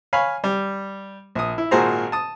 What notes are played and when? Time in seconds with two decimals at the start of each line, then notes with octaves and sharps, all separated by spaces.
0.13 C#5 F5 G#5 B5
0.44 G3
1.35 A#1 D#6
1.58 E4
1.71 G#1 A#2 F#4 G#4 C5 A#5
2.12 A5 D#6